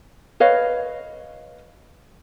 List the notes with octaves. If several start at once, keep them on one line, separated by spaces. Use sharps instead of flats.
B4 C#5 D#5 F5